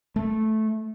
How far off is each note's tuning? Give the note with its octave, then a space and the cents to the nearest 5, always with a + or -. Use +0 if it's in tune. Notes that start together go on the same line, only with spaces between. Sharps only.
A3 -10